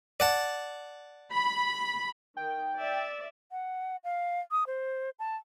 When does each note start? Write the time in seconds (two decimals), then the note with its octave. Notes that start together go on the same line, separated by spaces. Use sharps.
0.20 D5 F#5 A5
1.32 B5
2.37 D#3 G5
2.79 D5 E5
3.52 F#5
4.04 F5
4.51 D#6
4.67 C5
5.19 A5